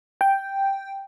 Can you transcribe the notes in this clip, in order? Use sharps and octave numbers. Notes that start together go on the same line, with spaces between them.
G5